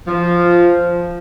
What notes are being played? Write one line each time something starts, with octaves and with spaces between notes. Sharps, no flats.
F3